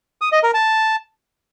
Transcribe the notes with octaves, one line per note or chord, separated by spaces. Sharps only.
D#6
D#5
A#4
A5